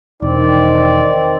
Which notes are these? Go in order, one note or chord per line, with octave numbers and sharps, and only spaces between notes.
E1 D#3 C4 D#4 D5